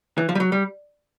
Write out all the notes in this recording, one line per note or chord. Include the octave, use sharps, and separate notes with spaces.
E3
F3
G3
F#3
G3